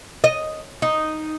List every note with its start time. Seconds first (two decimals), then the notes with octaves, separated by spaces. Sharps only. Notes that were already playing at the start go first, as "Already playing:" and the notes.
0.24 D#5
0.82 D#4